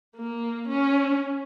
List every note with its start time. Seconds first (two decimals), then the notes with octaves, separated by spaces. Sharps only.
0.17 A#3
0.68 C#4